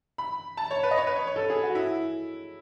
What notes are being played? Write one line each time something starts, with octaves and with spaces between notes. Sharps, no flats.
B5
A5
C#5
B4
D#5
C#5
B4
C#5
C#5
A4
G#4
F#4
E4